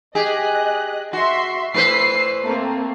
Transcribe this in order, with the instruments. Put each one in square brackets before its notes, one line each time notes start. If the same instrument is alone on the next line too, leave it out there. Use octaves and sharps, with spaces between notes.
[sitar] G4 G#4 [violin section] D#5 F#6
[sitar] F#4 [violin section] E5 C6
[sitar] A2 B4 C5 [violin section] E6 C7
[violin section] A3 A#3 C4